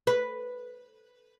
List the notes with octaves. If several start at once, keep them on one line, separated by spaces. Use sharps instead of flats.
B4